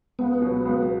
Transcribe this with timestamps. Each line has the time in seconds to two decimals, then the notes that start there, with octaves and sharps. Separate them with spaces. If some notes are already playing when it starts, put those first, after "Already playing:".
0.19 C#2 B3
0.41 B2 F#3
0.65 C#2